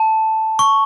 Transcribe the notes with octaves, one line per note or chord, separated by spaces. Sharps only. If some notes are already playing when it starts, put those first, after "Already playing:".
Already playing: A5
C#6